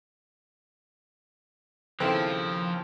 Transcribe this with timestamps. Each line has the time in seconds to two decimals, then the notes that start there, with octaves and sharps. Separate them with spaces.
2.00 D#2 C#3 F3 C4 E4 A4